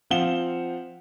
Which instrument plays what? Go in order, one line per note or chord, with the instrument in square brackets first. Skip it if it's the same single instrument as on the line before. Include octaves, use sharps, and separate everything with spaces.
[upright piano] F3 C4 F5 F#5 E7 G7